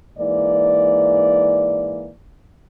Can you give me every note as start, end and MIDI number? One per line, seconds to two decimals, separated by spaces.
0.18 2.10 44
0.18 2.10 52
0.18 2.10 58
0.18 2.10 74